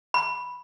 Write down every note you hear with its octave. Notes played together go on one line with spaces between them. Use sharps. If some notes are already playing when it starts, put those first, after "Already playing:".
B5